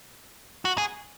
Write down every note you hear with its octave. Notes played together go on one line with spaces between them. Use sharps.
F#4
G#4